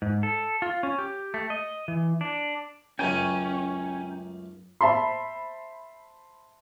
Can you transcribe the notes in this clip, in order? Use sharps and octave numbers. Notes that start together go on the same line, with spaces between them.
G#2
A4
F4
C#4
G4
A3
D#5
E3
D4
C#2 F#2 A3 C#4 G5 G#5 A#5
C5 E5 A5 B5 C6